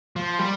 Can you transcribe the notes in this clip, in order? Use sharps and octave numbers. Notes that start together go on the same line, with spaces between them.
F3
G3